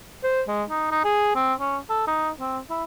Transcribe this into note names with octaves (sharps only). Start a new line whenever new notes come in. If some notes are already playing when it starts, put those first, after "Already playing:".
C5
G#3
D#4
D#4
G#4
C4
C#4
A4
D#4
C4
E4